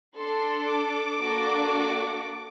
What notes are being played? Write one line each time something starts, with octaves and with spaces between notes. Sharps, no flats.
D4 A4 C6
D6
A#3 D4 F#4 A4